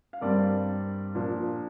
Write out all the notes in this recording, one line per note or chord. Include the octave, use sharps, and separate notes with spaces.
F5
G2 G3 C4 A#4 D5
A#2 F3 A#3 D4